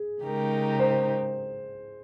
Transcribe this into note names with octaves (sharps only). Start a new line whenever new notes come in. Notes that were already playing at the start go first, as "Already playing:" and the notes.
Already playing: G#4
C#3 G#3 D#4 G4 A#4
C5